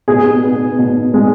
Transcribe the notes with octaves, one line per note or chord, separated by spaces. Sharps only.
B2 G#4
B3
B2
G#3